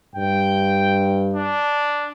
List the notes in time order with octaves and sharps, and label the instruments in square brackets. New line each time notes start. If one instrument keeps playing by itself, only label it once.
[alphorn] G2 [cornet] G5
[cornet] D4